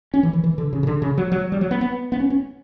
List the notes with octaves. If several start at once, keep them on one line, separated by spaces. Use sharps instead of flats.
C#4
E3
E3
E3
D3
C#3
C#3
D3
C#3
F#3
F#3
G3
F#3
B3
B3
B3
C#4
C#4